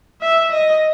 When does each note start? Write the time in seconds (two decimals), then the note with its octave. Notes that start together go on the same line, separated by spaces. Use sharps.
0.21 E5
0.52 D#5